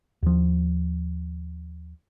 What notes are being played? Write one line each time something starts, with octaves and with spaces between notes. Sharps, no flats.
D#2 F3